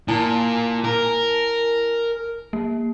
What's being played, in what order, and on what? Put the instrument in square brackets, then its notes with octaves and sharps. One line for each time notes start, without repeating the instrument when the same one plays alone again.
[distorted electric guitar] A#2 [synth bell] E4 G#5 A5
[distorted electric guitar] A#4
[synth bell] A#3